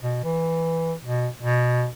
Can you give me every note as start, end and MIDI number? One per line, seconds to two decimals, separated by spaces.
0.03 0.21 47
0.24 0.94 52
1.04 1.28 47
1.43 1.87 47